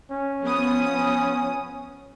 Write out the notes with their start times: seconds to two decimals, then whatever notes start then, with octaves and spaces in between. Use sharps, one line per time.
0.11 C#4
0.42 F3 B3 D#6